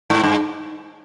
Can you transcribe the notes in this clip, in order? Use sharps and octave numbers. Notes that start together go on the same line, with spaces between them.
G#2
G2